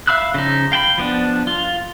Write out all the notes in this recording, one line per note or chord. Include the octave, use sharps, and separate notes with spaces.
E5 F5 B5 E6 F#6
C#3 F3 D#4
F5 G5 A5 B5
F3 B3 D4
F4